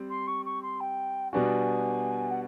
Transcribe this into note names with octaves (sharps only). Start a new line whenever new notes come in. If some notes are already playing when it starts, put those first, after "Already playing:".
Already playing: G3 C4
C6
C#6
C#6
C6
G5
B2 G3 B3 D4 F#4 G#5
F#5